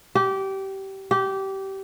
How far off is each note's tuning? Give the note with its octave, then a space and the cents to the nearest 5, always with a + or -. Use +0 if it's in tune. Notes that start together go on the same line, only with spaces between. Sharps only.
G4 -20
G4 -20